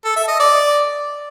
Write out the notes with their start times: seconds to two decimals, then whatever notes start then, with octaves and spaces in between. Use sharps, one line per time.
0.05 A4
0.16 E5
0.28 D#5
0.40 D5